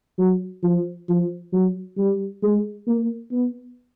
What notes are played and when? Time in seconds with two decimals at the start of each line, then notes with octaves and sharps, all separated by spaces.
0.19 F#3
0.63 F3
1.09 F3
1.52 F#3
1.97 G3
2.43 G#3
2.87 A#3
3.31 B3